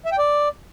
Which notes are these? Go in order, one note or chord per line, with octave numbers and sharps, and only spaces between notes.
E5
G5
D5